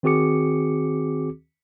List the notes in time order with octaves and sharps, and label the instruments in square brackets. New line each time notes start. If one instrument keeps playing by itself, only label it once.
[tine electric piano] D#3 C4 F#4 G#4 D6 C#7